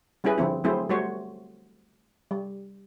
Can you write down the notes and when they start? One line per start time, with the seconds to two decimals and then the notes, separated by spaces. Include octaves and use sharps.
0.24 G3 C#4 E4 G#4 B4
0.38 D3 F3 C4 E4
0.64 F#3 A3 C4 E4 G#4 C5
0.89 G3 A3 F#4 C5 C#5
2.31 G3